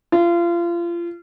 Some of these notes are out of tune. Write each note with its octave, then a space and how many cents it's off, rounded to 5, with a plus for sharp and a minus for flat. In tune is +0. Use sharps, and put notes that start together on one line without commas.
F4 -30